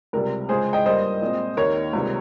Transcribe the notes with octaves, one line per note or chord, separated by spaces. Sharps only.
C#2 C3 G3 A#4
C#2 C#3 G#3 G#4 C5
D#5 G5
G2 G3 A#3 C5 D#5
A#2 G#3 C4
D#2 D#3 A#3 A#4 C#5
C#2 C3 G3 C4